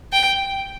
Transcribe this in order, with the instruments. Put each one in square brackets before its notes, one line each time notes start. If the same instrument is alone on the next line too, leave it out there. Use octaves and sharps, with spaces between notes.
[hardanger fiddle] G5